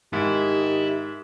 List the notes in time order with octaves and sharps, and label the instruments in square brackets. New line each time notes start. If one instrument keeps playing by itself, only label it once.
[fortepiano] G#2 [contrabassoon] D#3 [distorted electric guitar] E4 [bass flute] G4